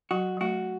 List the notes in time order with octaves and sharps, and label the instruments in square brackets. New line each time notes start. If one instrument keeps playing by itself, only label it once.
[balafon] F#3 [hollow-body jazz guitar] F#4
[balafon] F#3
[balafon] A3 [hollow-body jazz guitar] F#4